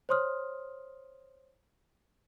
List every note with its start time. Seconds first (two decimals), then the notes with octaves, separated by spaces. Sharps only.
0.09 C5 C#5 C6 D#6 F6